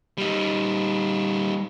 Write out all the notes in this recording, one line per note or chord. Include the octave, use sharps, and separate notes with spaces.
G3 D#4